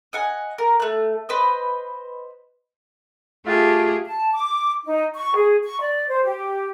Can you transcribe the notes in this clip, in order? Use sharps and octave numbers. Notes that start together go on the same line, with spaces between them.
D#5 F#5 G#5
A#4
A3 F#6
B4 C5 D#5
A3 F4 G4 G#4
A5
D6
D#4
C#6
G#4
C#6
D5
C5
G4